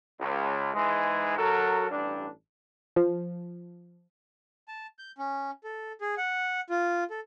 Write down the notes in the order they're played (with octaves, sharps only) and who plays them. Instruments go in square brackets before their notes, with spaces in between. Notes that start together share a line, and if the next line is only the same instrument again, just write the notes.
[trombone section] C#2
G#2 E3 G#3
F#3 F#4 A4 A#4
A1 G2 D4
[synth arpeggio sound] F3
[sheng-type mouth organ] A5
G6
C#4
A4
G#4
F#5
F4
A4